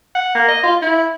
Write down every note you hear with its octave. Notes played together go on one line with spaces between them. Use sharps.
F#5
A#3
D#5
F4
E4